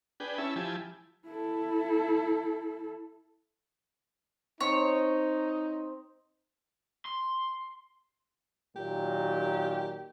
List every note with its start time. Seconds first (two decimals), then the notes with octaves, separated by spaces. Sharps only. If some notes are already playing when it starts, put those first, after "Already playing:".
0.20 D4 G#4 B4 G5
0.38 C#4 E4 E5 A5
0.56 F3 E4 G4 G#5 A5
1.26 E4 A4
4.61 C4 D#4 C#5
7.06 C6
8.76 A#2 D#3 F#3 G4